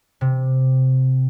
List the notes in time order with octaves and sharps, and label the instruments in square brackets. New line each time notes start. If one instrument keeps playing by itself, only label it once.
[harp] C3